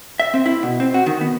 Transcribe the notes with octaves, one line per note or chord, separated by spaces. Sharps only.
E5
C4
E4
B2
C4
F#4
D#3
B3